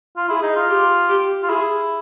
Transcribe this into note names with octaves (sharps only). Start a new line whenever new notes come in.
F4
E4 G#4
D#4
F4
G4
G4
F4
E4 G#4